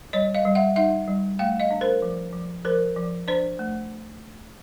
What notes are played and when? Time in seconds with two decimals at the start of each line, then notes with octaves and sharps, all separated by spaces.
0.13 G3 C#5 D#5
0.35 D#5 F5
0.45 G3
0.55 E5 F#5
0.76 D#4 E5 F#5
1.08 G3
1.39 A3 F5 G5
1.60 D#5 F5
1.71 D4
1.81 A#4 C5
2.02 F3
2.33 F3
2.65 F3 A#4 C5
2.96 F3
3.28 D4 C5 D5
3.59 A3